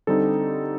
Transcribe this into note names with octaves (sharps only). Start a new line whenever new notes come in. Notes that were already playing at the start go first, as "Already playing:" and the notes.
D3 G3 C4 D#4 A4